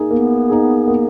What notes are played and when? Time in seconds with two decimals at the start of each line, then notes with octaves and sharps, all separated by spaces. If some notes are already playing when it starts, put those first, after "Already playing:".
Already playing: A#3 D#4 G#4
0.11 A#3 B3
0.50 D#4 G#4
0.87 A#3